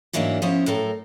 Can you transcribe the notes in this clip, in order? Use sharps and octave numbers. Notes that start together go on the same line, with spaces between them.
G#2 E3 F#3 A#3 B3 D4
F3 B3 C#4 E4 C5 C#5
A2 F#3 A4 A#4